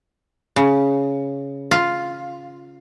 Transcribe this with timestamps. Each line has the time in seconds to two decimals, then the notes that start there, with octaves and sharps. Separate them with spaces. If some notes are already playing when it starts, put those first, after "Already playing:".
0.56 C#3
1.71 F4